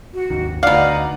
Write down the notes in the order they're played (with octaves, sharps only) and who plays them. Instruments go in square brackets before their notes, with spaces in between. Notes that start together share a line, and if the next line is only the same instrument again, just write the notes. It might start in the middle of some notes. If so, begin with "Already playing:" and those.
[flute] F#4
[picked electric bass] G#1 D#2 D#3
[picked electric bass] D2 D3 [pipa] B2 F5 [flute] D#4 [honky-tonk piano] D5 F#5